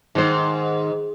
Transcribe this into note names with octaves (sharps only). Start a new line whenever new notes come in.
G#2 D#3 C5